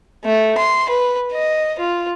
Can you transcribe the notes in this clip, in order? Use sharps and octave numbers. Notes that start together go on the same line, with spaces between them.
A3
C6
B4
D#5
F4